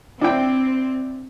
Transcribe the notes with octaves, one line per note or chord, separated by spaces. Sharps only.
C4 D4 E4 G5